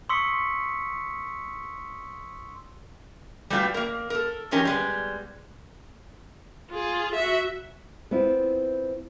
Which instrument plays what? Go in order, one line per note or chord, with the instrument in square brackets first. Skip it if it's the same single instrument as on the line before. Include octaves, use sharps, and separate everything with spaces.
[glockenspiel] C6 C#6 D#6 E6 B6 C#7
[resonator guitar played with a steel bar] G3 A3 B3 F4 F#4 G5
A#3 A#4
A4 A#4
D#3 F3 C#4 G4 A#4
G3 G#3 B3
[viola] F4 G#4
F#4 E5
[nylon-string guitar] B3 C4 E4 F4